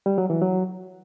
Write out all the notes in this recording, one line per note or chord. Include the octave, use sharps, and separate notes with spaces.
G3
F#3
E3
F#3